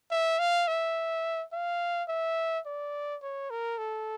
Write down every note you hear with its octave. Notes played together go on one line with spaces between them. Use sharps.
E5
F5
E5
F5
E5
D5
C#5
A#4
A4